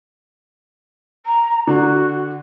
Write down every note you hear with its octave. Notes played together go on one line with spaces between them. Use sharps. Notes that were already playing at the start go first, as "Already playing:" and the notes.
A#5
D3 F#4